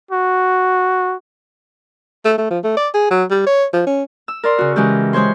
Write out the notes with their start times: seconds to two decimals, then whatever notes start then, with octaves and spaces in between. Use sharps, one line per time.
0.11 F#4
2.25 A3
2.38 A3
2.50 F3
2.64 A3
2.77 D5
2.94 G#4
3.10 F#3
3.30 G3
3.46 C#5
3.73 F3
3.86 C#4
4.28 E6
4.43 A#4 D5 C6
4.58 C#3 F#4
4.76 C#3 E3 G#3 C#4 G4 A#4
5.13 G#3 C5 C#5 C6